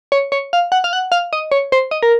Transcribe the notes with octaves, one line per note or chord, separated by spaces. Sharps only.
C#5
C#5
F5
F#5
F5
F#5
F5
D#5
C#5
C5
D#5
A#4